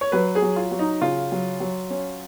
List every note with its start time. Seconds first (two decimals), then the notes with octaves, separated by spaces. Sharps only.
0.01 C#5
0.12 F#3 B4
0.35 G#4
0.42 F#3
0.56 F4
0.71 F#3
0.79 D#4
1.01 C#3 F4
1.32 F#3
1.60 F#3
1.90 C#4